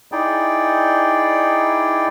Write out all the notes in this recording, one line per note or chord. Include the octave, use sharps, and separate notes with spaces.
D#4 E4 G#4 D5 G5